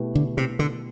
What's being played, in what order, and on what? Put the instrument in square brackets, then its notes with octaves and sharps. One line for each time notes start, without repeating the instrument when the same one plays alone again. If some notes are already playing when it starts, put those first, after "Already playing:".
Already playing: [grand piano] B2 A3 E4 G4 B4
[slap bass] D3
C3
D3